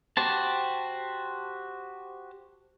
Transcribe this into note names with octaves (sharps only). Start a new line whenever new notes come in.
F#4 G4 C5 A5